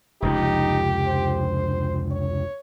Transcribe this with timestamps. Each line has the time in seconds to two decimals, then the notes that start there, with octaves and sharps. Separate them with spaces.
0.22 F1 C#2 F3 D#4 G4
1.07 C5
2.11 C#5